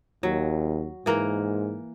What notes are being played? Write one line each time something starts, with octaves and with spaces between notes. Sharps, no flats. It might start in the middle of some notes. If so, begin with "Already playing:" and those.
D#2 F#3
G#2 E3 A#3 A#4